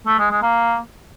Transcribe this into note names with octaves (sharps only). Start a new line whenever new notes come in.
A3
G#3
G#3
A#3